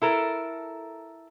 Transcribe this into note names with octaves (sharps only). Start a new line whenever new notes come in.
E4 A4 A#4